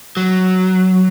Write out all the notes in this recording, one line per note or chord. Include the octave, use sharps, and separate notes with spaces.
F#3